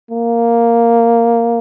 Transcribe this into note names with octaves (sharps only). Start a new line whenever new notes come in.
A#3